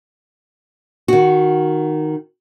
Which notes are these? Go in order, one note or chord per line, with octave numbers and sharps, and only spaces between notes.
D#3 F#4